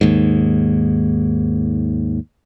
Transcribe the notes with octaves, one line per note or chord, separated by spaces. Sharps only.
D#2 G#2